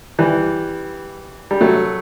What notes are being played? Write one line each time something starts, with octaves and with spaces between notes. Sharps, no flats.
E3 G3
G3
F#3 A3